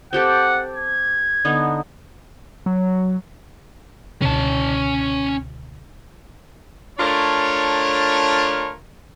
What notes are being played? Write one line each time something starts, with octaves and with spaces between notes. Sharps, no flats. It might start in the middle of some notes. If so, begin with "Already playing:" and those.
C4 G4 A4 F#5
G#6
D3 B3 D#4
F#3
C#2 B2 D3 C#4 A5
A3 D4 F4 A#4 C#5